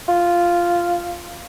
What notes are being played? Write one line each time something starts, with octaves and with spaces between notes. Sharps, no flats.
F4